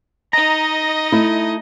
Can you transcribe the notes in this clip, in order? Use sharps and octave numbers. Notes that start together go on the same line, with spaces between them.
D#4 D#5 A#5
A3 E4